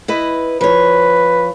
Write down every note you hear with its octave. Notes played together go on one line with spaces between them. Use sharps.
E4 B4 D#5
F3 B4 C#5